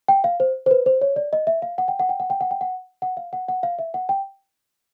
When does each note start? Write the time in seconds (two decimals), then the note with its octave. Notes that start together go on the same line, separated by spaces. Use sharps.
0.08 G5
0.24 F5
0.40 C5
0.66 C5
0.71 B4
0.86 C5
1.01 C#5
1.16 D5
1.33 D#5
1.47 E5
1.62 F5
1.78 F#5
1.88 G5
2.00 F#5
2.09 G5
2.20 F#5
2.30 G5
2.41 F#5
2.51 G5
2.61 F#5
3.02 F#5
3.17 F5
3.33 F#5
3.48 F#5
3.63 F5
3.79 E5
3.94 F#5
4.09 G5